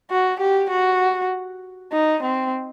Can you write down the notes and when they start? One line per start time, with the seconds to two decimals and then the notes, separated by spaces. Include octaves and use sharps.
0.10 F#4
0.40 G4
0.70 F#4
1.92 D#4
2.23 C4